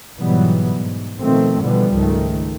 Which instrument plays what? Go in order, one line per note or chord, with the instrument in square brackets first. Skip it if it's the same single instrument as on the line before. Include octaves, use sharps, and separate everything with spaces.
[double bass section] G#2 B2 E3 F#3 G3 B3
G#2
B2 D#3 F3 A3 C4
B2 D3 E3 F3 G3 B3
C#2 G#2 D#3 A3